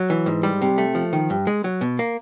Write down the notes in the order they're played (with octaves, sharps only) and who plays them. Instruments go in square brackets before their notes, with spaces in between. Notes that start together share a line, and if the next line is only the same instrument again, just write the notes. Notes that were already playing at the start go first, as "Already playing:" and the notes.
Already playing: [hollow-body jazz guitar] F#3
E3
G#2
G3
C3
A3
F3
D#3
G2
G#3
F#3
B2
A#3